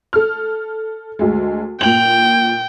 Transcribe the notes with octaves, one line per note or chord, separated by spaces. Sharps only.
A4 F6
D2 G#3
A#2 G5 F7 F#7